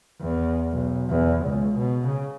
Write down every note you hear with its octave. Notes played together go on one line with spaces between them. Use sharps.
E2
B1
E2
C#2
B2
C#3